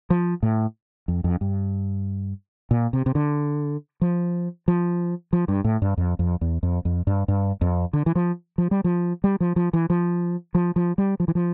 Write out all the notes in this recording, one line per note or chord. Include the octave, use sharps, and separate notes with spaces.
F3
A2
F2
F2
G2
A#2
C3
C3
D3
F3
F3
F3
G2
A2
G2
F2
F2
E2
F2
F2
G2
G2
F2
D3
E3
F3
F3
G3
F3
G3
F3
F3
E3
F3
F3
F3
G3
F3
E3
F3